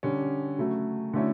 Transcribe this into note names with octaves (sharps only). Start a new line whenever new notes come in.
D3 G3 C#4
C#3 F#3 A3
D3 F#3 A3 C#4 E4